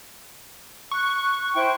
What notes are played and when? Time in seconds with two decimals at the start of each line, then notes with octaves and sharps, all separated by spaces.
0.91 C#6 F#6
1.54 E4 C5 G5